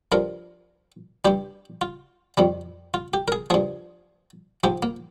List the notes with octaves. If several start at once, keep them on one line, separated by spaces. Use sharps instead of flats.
G2 F3 A#4
G2 G3 G4
F4
F2 D#3 G3
F4
G4
A#4
G#4
G2 F3 G#4
G#2 F3 G4
A#3